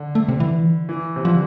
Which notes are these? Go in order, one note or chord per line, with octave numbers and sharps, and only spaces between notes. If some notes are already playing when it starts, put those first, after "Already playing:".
Already playing: D3
A3
C3
E3
E3
C3
D3 F3